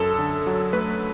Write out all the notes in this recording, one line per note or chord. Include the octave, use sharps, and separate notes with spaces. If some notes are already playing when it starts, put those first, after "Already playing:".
Already playing: F#2 A4
D3
F#3
A3 B4